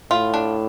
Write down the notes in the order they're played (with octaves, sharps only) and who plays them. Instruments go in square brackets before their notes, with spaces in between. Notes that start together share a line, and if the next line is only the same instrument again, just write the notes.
[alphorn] A2 [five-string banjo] F4
[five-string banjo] D4